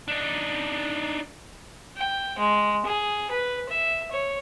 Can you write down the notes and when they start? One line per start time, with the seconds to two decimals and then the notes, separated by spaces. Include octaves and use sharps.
0.08 D4 D#4
1.97 G5
2.39 G#3
2.86 G#4
3.31 B4
3.69 E5
4.11 C#5